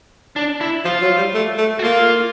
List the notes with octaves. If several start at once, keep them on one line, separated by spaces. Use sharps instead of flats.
D4
E4
F3 F4
F#3
G3
A3
A3
F#4
A#3 F4